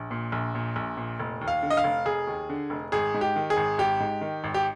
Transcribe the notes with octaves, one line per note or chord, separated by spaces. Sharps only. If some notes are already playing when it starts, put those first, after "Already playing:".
Already playing: A#1
A#2
A#1
A#2
A#1
A#2
F1
D#2
F5
D3
D#5
F5
F1
F1 G#4
D#2
D3
F1
G#1 G#4
G#2
G4
D#3
G#4
G#1
G#1 G4
G#2
D#3
G#1
G4